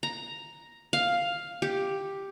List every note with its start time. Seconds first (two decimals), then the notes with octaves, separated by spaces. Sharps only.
0.03 A#5
0.93 F5
1.62 G4